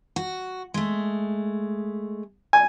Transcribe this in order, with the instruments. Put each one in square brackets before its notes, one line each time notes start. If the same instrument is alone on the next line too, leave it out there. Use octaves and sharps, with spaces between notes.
[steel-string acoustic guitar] F#4
G#3 A3
[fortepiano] G#5